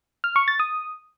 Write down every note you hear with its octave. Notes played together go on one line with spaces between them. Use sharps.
F6
C#6
A6
D#6